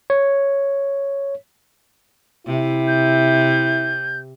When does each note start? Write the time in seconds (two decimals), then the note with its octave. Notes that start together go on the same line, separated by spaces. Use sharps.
0.10 C#5
2.46 C3 E4
2.88 G6